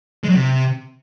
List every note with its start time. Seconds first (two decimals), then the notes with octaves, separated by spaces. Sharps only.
0.24 G#3
0.29 F#3
0.34 C3